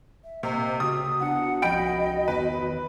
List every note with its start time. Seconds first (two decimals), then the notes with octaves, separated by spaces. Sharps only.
0.24 E5
0.43 C3 A#3 D#5
0.80 C#3 F#4 D#6
1.21 B3 D4 F#5
1.62 C2 F3 C#4 F#4 D#5 G5 B5 D7
2.28 E2 D#3 B3 B4